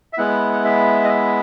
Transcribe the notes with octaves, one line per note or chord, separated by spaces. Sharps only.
E5
G#3 B3 E4 F#5
F#5
E5
D#5
E5